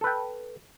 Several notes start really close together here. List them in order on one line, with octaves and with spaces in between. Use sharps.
A4 B4 G5